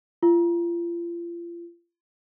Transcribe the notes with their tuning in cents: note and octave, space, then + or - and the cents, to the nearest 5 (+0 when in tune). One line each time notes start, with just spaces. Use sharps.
F4 -35